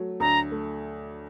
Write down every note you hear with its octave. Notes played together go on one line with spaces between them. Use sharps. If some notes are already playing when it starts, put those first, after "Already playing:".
Already playing: F#3 A3
D2 A#5
A3